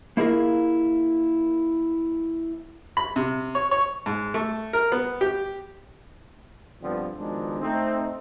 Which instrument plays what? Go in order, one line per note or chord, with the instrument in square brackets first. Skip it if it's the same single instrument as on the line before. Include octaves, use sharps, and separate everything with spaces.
[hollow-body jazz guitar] A#3 E4 F4 G#4 A#4
[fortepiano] B5
C3
C#5
C#5
G#2
A3
A#4
B3
G4
[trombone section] G2 D3 F3 B3 C4
B2 D#3 F3 G#3 D4 D#4
A3 C4 D#4